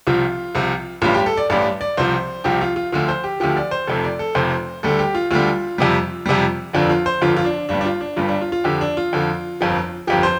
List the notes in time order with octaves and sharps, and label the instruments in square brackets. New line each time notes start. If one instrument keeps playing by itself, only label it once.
[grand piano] C2 C3 F3 F4
C2 C3 F3
A1 G2 G3 F4
G4
A4
D5
A1 G2 G3 D5
D5
C2 C3 F3 C5
C2 C3 F3 G4
F4
F4
D2 D3 F3 F4
C5
G4
D2 D3 F3 G4
D5
C5
F1 F2 C3 A4
D5
A4
F1 F2 C3 C5
D2 D3 G3 A4
G4
F4
D2 D3 G3 F4
F2 C3 G3
F2 C3 G3
G1 F2 D3 F3 D4
F4
C5
G1 F2 D3 F3 F4
F4
D4
G1 G2 G3 D4
D4
F4
D4
G1 G2 G3 F4
D4
F4
F4
F2 D3 F3 G4
D4
F4
F2 D3 F3
G1 F2 F3
G1 F2 F3 G4
C5